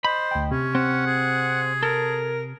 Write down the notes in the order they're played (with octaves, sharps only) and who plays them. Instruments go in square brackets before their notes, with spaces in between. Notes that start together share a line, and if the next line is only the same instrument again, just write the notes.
[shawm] C5 [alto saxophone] D#5 [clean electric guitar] B5
[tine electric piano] D2 G5
[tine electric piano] C3 [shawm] C#4
[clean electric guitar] C4 [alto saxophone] F#5
[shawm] G#4
[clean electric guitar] A4 [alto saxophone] A#4